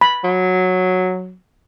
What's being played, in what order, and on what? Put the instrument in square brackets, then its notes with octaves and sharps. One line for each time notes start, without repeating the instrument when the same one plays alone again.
[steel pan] B5
[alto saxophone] F#3